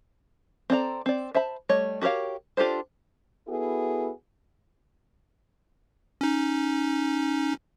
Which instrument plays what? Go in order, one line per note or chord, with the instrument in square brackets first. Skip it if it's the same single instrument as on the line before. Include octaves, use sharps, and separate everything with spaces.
[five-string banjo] C4 A4 D5 A#5
C4 D5
C5 E5 A5 B5
G3 A3 C#5 D#5
F#4 G4 A#4 C#5 F5
D4 F4 G4 A4 C5
[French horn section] B3 E4 F#4 G#4 A4
[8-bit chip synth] C#4 D#4